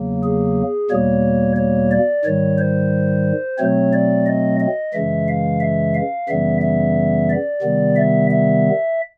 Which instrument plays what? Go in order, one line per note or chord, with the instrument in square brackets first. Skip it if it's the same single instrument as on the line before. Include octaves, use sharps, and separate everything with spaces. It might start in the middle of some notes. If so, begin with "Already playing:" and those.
Already playing: [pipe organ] E2 C#3 F#3 A#3
G#4
E2 B2 G3 A#3 C#5
C#5
D5
G#2 D#3 G3 C#5
C5
B2 F#3 A3 C4 C#5
D5
D#5
D#5
F#2 C#3 E3 G#3 E5
F5
E5
F5
F#2 C#3 E3 G3 B3 E5
E5
D5
C3 D#3 G3 B3
E5
E5